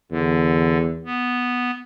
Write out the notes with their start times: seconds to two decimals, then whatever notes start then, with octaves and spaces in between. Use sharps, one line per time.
0.11 E2 D3
1.05 B3